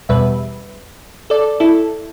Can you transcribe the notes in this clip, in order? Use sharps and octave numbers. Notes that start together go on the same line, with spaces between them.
E2 B2 G3 B4 E5
A4 D5
E4 A4